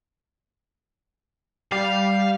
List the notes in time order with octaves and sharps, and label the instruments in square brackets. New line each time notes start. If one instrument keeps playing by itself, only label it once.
[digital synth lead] G3 [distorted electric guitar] F5